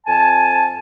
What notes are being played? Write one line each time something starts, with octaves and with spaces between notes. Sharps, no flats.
F2 G#5 A5